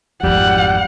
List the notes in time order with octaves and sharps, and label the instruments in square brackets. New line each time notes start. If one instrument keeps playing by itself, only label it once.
[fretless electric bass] G#1 F2 [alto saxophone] G3 [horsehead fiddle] F#5